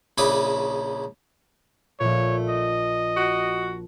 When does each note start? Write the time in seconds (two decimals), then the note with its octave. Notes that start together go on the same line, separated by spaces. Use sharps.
0.18 A#1 C#3 E4 B5 D6 D#6
2.00 A#1 A#2 A3 C#5
2.49 D#5
3.16 F#4